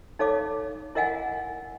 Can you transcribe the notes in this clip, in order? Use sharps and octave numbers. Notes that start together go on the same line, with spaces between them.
D#4 A4 C#5 F5 D6
E4 A#4 D#5 F5 F#5 G#5